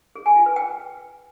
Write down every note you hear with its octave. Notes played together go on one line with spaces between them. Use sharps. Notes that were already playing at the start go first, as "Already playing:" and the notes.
G#4
G#5
F4
B4
G5